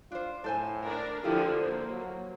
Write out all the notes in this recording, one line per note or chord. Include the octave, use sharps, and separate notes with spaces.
D4 F4 C5
A2 A4 C5 G#5
D4 A#4
D3 F3 E4 F4 G4
A#3 C5
F#3